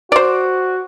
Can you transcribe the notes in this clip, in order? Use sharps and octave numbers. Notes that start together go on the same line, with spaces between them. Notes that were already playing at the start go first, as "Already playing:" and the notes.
F#4 C5 D5